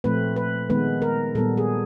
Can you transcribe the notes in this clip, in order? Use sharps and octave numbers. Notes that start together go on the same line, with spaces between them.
A#2 F3 A3 C4 B4
B4
D#3 G#3 B3 B4
A#4
A#2 G3 B3 A4
G#4